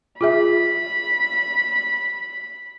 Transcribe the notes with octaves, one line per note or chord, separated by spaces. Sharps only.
F4 G#4 E5 B5